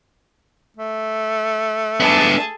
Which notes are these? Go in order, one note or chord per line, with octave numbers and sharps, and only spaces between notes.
A3
B3 D4 G#4 A4